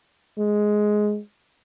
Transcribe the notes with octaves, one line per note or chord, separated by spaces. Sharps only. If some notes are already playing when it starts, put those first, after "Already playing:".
G#3